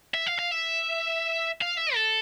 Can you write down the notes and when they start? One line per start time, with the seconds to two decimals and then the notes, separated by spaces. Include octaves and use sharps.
0.14 E5
0.26 F5
0.39 F5
0.52 E5
1.61 F5
1.77 E5
1.94 A4